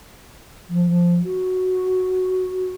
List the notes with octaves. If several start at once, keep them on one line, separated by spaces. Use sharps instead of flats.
F3
F3
F#4